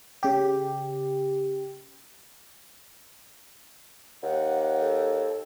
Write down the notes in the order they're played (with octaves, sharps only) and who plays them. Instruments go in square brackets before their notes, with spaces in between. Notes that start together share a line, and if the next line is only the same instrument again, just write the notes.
[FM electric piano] C#3 G4
[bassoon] D#2 [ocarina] F#5
[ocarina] A4